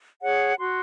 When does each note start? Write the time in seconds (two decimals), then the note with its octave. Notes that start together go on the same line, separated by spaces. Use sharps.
0.22 G#4 C#5 F#5
0.59 F#4 C6